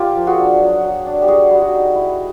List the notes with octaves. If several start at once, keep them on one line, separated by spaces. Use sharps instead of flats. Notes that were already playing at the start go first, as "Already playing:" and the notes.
Already playing: A#3 F4 G4
F3
F#4 G#4
D4
F#3
F#3
D4
G4
G3 F#4 G#4
G3
F#4
D#4
E4